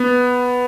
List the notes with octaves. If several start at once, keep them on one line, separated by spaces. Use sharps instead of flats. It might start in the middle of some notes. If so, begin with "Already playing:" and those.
Already playing: B3